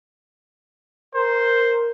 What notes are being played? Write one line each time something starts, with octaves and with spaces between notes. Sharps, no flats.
A#4 C5